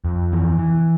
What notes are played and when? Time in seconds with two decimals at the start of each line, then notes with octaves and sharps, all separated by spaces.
0.05 F2
0.32 E3
0.59 E3